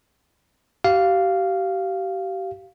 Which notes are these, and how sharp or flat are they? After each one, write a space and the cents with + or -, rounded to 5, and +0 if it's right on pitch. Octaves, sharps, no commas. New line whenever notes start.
G4 -35 F5 -5